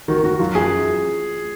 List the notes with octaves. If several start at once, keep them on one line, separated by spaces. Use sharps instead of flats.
D#3 F#4
D#3 F#4
F#3 F4
F#2 G#4